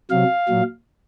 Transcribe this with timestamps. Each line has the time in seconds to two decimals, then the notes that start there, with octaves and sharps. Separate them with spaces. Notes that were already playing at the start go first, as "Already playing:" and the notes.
0.11 C3 F#3 F5
0.48 A#2 F#3